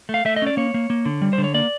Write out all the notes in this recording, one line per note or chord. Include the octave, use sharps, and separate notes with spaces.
A3
F5
A3 E5
D#5
C#4 D5
A#3 C#5
A#3
A#3
D3
G3
C5
D3
C#5
A#3 D5